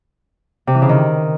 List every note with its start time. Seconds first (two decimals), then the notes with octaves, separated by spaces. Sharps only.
0.67 C3
0.75 E3
0.82 C#3
0.89 D#3